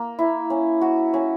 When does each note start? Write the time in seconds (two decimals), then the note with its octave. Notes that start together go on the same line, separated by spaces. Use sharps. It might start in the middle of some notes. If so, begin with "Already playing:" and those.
Already playing: A#3
0.19 E4
0.50 C#4
0.81 F#4
1.14 C#4